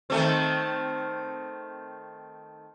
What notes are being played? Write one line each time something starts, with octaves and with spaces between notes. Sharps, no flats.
D#3 A3 C4